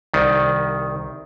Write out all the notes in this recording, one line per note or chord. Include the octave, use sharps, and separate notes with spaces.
C2 D#3